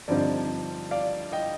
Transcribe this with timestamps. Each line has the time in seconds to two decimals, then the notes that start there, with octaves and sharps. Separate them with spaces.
0.08 G2 D3 F3 C4 D#4 D5
0.91 D5 F5
1.32 D#5 G5